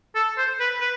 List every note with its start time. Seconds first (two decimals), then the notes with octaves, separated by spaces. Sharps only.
0.15 A4
0.38 C5
0.60 B4
0.81 B4